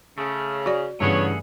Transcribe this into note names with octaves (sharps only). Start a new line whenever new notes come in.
C#3 A3
F#4 D5
G2 C#3 E3 A3 B3 G#4 C#5 F#5